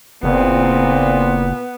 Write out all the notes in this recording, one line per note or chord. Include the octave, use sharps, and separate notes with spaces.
F#1 A#2 B3 C4